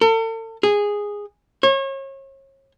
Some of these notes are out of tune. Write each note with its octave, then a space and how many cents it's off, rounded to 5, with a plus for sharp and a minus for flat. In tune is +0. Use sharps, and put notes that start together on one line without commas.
A4 +40
G#4 -10
C#5 -35